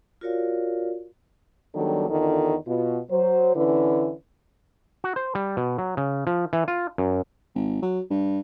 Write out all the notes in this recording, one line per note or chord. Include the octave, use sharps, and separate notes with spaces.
F4 F#4 A#4 C#5 D5 F5
D#3 F#3 G3 B3 D4 A4
E2 D3 D#3 D#4 F4 A4
B2 F4
F#3 C5
D3 E3 C#4 E4 B4
F#4
C5
G3
B2
F#3
C#3
F3
E3
F4
F#2
G#1
F#3
G2